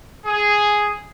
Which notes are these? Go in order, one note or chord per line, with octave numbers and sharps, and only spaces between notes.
G#4